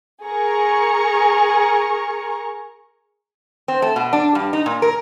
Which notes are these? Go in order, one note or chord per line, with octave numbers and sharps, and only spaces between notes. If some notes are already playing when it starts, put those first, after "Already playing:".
G#4 A#4 A#5 C#6
C4
A3
B2
D4
G2
D#4
A#2
A#4